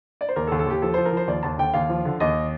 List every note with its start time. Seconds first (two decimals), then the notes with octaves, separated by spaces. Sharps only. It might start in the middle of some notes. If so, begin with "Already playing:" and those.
0.21 D5
0.28 C5
0.36 D#2 A#4
0.47 A4
0.52 D#2
0.59 A4
0.66 D#2 G4
0.82 F3 A4
0.94 F3 C5
1.05 A#4
1.12 F3 C5
1.27 D#2 D5
1.43 D#2 A5
1.58 D3 G5
1.74 D#2 F5
1.89 F3
2.05 D3
2.20 D#2 D#5